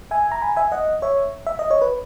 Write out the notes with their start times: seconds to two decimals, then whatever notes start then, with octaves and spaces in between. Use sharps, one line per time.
0.11 E5 G#5
0.32 A#5
0.42 G#5 B5
0.56 E5 G#5
0.72 D#5 F#5
1.02 C#5 E5
1.47 E5
1.59 D#5
1.70 C#5
1.82 B4